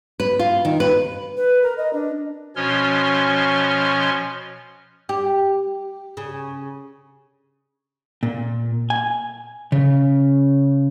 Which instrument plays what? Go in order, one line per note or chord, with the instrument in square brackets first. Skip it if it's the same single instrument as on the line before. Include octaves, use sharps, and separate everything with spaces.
[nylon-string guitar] B4
F4
D#3
B4
[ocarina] B4
A#4
D#5
D4
[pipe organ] B2 F3 C#4 C#5 C6 F6
[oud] G4
C#3
[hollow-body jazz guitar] A#2
G#5
C#3